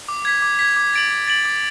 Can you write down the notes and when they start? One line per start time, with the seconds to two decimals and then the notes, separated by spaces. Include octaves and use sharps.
0.08 D6
0.25 G#6 B6
0.42 D6
0.59 G#6 B6
0.76 D6
0.94 A6 D7 F#7
1.11 D6
1.28 A6 D7 F#7
1.45 D6